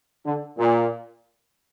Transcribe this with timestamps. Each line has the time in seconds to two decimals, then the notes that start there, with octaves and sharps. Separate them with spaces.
0.25 D3
0.58 A#2